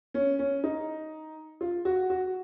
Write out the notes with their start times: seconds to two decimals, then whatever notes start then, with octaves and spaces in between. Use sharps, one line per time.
0.14 C#4
0.39 C#4
0.64 D#4
1.61 F4
1.85 F#4
2.10 F#4